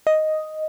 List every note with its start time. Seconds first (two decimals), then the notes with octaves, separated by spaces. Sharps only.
0.07 D#5